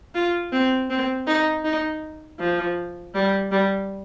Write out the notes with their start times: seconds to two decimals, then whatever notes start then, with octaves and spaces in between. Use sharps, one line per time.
0.15 F4
0.52 C4
0.90 C4
1.27 D#4
1.64 D#4
2.39 F3
3.14 G3
3.51 G3